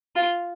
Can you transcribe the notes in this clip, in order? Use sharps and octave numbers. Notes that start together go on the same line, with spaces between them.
F4